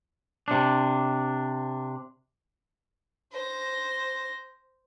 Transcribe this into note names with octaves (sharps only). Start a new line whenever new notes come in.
C3 D4
C5 A#6